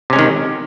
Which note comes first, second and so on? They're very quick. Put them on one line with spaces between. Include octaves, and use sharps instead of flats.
C3 C#4 G#3 D#3